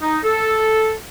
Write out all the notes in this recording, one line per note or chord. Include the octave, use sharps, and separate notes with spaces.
D#4
A4